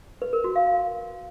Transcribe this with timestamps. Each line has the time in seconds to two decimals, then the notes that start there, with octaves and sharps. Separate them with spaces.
0.22 B4
0.33 A#4
0.44 F#4
0.56 F5
0.67 F5